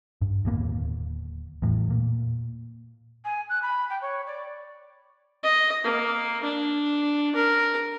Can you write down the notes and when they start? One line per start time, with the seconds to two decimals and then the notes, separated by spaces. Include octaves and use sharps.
0.21 G2
0.45 D1 D#2 A#3 B3
1.62 E2 A2
1.90 A#2
3.25 G#5
3.50 F#6
3.62 B5
3.90 G5
4.02 C#5
4.27 D5
5.44 D#5
5.84 A#3
6.44 D4
7.36 A#4